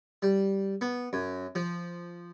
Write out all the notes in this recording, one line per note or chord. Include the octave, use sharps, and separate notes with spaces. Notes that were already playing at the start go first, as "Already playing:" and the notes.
G3
B3
F#2
F3